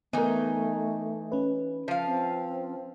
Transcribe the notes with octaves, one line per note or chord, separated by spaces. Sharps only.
E3 A3 B3 D#4 A#4
C#4 B4
F3 F5
C4